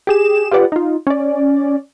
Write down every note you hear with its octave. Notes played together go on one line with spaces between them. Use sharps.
G4 G#4 E7
F4 G4 B4 D5 F#5
D#4 F4
C#4 D5